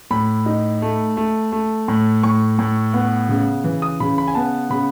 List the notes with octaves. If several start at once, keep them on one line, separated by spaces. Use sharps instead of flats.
A2 B5
D#4
A3
A3
A3
A2
A2 C#6
A2
B3
C#3
E3
D#6
C#3 B5
B5
G#5
B3 A5
C#3 B5